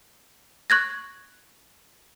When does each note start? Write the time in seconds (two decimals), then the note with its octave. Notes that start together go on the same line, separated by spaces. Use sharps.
0.70 C#6 F#6 G#6 A#6